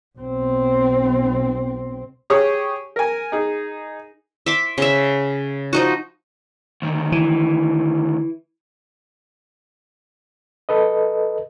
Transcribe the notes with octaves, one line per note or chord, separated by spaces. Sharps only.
B1 C4
G4 G#4 C#5 C#6 D#6
A#4 G#5
D#4 G#4
E5 C6 D6
C#3 E5
F3 D#4 F#4
D2 D#3
E3
A4 B4 D#5